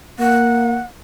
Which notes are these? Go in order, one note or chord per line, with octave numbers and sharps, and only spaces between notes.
A#3 F#5